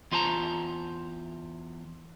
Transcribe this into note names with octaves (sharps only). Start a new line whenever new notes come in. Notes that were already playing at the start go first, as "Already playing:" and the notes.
E2 F4 C5 A5 A#5